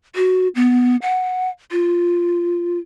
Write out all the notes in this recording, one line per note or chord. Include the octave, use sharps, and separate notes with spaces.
F#4
B3
F#5
F4